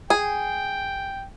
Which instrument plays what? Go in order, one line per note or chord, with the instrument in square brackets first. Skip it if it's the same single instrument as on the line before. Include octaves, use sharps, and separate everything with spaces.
[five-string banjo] G#4 [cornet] G5